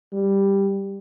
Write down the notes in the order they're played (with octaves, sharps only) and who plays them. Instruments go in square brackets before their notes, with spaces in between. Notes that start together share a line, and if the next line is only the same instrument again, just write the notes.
[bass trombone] G3